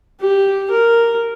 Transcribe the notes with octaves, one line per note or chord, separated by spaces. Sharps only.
G4
A#4